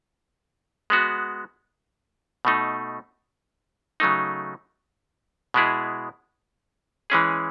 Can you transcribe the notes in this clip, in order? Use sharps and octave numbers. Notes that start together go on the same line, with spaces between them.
G#3 B3 F#4
B2 A3 D#4
C#3 F#3 A3 D#4
B2 G#3 B3 E4 G#4
E3 G#3 C#4 G#4